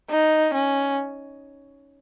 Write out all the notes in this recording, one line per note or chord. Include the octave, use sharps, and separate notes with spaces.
D#4
C#4